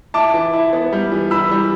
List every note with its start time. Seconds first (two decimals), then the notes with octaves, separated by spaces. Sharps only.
0.14 E4 A5 D6
0.34 E3
0.54 E4
0.73 B3
0.92 G3
1.12 E3
1.31 E3 B5 E6
1.51 G3